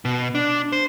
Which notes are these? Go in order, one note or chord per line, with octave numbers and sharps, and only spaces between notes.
B2
D4
C5